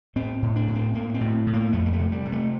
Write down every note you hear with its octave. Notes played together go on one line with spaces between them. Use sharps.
A2 C4
A2
D4
A2
C4
A2 A#3
C4
A2
A2
A#3
F2 A3
A#3
A3
C3
G3
C3
A3